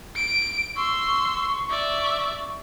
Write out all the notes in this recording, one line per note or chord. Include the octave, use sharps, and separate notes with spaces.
D7
C6 C#6 E6
D5 E5